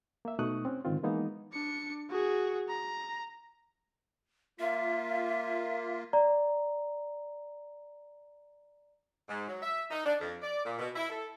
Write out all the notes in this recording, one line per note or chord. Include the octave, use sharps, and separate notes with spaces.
A#3 E5
B2 A3 D#4 C#6 D#6 F#6
C4 C#4
G#2 D3 D#3 C4 F4
E3 G#3 A#3 B3 D#4
D4 C#7
F#4 G#4
A#5
A#3 F4 E5
D5 A#5
G#2
F#3
E5
D#4
D4
F2
D5
A#2
B2
E4
A4